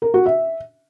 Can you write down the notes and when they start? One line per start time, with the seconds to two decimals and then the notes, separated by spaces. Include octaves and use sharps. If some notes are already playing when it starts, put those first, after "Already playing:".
0.02 A#4
0.14 F#4
0.26 E5